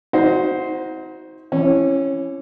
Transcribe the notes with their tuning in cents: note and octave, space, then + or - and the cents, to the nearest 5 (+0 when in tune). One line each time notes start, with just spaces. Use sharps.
D#4 +40 F#4 -5 C5 +0
E3 +30 C#4 -15